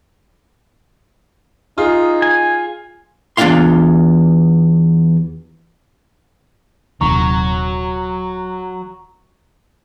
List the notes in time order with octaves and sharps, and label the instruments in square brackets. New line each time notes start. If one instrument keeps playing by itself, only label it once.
[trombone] D#4 [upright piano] F4 G#4
[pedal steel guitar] G#5
[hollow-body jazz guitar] E2 D4 E4 F4 F5 C6
[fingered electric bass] D#1 C3 D#3 [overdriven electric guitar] F#3 [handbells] A#5 C#6